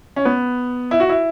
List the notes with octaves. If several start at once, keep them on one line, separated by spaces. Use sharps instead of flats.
C#4
B3
E4
F#4
E4